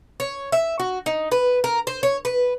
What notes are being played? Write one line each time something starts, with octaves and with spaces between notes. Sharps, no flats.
C#5
E5
F#4
D#4
B4
A#4
C5
C#5
B4